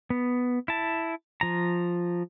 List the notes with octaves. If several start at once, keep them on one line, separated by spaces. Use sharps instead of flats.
B3
E4 A5
F3 A#5